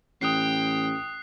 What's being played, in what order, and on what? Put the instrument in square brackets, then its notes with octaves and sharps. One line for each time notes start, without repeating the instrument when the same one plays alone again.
[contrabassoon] A1 [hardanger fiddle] G5 [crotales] D#6 F#6 C7